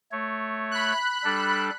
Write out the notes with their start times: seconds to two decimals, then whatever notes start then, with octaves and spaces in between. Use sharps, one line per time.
0.12 A3 C#5
0.71 B5 F#6
1.24 G3 D4 A4